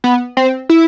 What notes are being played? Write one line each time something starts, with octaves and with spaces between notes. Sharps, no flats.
B3
C4
E4